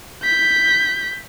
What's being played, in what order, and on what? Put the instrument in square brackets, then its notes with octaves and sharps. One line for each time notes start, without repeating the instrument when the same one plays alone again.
[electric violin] G6 B6